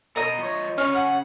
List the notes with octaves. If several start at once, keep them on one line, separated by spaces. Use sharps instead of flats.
B2 D#5 A#5
F3 C#5
C#3 C#4 F6
F#5